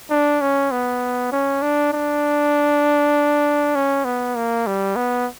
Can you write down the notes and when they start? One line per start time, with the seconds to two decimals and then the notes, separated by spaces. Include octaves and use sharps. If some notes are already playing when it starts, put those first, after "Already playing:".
0.10 D4
0.41 C#4
0.72 B3
1.32 C#4
1.62 D4
1.93 D4
3.75 C#4
4.05 B3
4.36 A#3
4.67 G3
4.96 B3